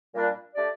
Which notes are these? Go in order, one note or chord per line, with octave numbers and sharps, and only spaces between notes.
A#2 G3 D4
A3 D4 G4 D5